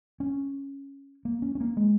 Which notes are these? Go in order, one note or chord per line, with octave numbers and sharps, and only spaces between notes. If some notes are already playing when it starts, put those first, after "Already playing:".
C#4
A#3
C#4
C#4
A#3
G#3